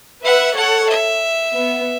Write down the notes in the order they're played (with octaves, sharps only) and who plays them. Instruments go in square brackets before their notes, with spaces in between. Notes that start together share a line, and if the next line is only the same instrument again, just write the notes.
[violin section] B4 E5 [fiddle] F#5
[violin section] A4 C#5 [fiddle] F#5
[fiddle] E5
[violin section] B3